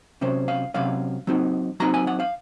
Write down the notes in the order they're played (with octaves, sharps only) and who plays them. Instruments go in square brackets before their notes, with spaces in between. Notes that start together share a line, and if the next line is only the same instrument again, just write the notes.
[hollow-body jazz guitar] C3 F#3 C#4 C5
F5
C3 F#3 C#4 F5
F#3 C4 D#4
F#3 C4 D#4 A#5
G#5
F#5
F5